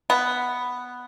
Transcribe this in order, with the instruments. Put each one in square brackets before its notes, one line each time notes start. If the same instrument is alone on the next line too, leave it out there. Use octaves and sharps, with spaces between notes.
[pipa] B3